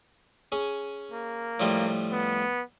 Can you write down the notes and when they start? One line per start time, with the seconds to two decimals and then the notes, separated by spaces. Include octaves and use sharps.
0.52 C#4 G#4
1.12 A#3
1.60 A2 F3 G3
2.12 B3